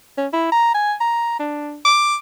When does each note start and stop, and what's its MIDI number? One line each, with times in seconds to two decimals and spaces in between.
0.18 0.27 61
0.33 0.49 64
0.52 0.74 82
0.74 0.94 80
1.01 1.34 82
1.39 1.79 62
1.85 2.15 86